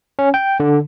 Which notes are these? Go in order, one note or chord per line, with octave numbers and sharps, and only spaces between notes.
C#4
G5
D3